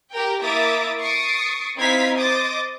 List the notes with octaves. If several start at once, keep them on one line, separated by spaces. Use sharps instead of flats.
G4 A#4 G5
A#3 E4 E5 D6 D#6 A6
C#6 D#6 A6 C7 D7
C4 D#4 E4 F5 G#6 B6
C5 D#5 D6 D#6 A6